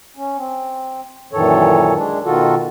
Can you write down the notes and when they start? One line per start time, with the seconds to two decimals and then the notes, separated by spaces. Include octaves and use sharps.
0.17 C#4
0.38 C4
1.33 F#2 A#2 D#3 E3 A4 C#5
1.95 G#3 D4
2.25 B2 D#3 F4 F#4 A4